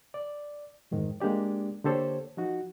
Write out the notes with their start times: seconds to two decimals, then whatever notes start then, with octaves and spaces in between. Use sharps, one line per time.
0.14 D5
0.91 F2 G#2 D#3
1.20 G#3 A#3 D4 G4 D5
1.84 D3 A#3 G4 A4 C5 C#5
2.37 F3 D#4 F#4